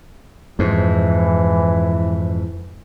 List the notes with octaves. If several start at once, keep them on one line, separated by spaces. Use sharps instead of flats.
F2 G#2 E3